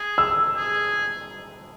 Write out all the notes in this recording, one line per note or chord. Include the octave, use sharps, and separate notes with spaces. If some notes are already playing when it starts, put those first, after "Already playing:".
Already playing: G#4
E6
G#4